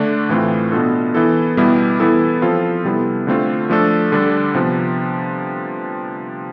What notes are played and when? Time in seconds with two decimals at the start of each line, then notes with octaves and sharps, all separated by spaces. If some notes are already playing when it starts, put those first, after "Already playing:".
Already playing: D3 A3 D4
0.29 A2 E3 A3 C4 F4
0.72 B2 B3 D4 F4 A4
1.14 E3 B3 E4 A4
1.57 B2 G3 B3 E4 G4
2.00 E3 B3 E4 A4
2.42 F3 C4 F4 A4
2.85 C3 G3 B3 E4 A4
3.27 D3 A3 C4 F4
3.69 F3 A3 D4 A4
4.12 D3 G3 D4 A4
4.54 C3 F3 B3